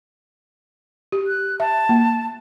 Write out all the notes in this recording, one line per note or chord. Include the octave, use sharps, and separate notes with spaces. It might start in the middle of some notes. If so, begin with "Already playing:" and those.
G4
F#6
E5 A5
A#3